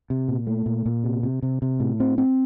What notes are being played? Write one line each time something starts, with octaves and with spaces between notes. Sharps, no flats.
C3
A#2
A3
A#2
A#2
C3
C3
C3
C3
A2
C4
C4